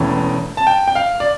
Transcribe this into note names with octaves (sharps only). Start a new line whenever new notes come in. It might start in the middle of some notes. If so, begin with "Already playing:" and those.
Already playing: E1 E2 E3 A3 C#4 G5
A5
G5
G5
F5
D5